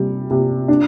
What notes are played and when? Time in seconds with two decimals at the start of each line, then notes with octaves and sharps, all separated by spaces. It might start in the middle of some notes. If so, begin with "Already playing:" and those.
Already playing: C3 G3
0.31 C3
0.68 D4